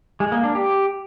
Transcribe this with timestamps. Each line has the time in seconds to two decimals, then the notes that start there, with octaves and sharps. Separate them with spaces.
0.20 G#3
0.32 A#3
0.43 D4
0.55 G4